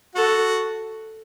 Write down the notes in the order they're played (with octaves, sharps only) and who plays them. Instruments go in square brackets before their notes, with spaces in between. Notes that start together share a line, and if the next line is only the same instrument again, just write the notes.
[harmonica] F#4 [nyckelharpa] A4